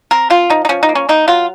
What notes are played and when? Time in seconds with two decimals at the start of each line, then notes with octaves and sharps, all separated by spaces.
0.11 C4 A#4
0.30 F3 F4
0.50 F3 D#4
0.65 D#4
0.69 F3 C#4
0.83 D#4
0.89 A#3
0.95 C#4
1.09 A#3 D#4
1.28 F#3 F4